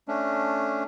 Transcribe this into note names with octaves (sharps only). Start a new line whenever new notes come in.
A3 C#4 D4